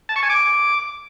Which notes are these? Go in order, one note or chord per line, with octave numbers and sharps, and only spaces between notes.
A5
C#6
G#5
D6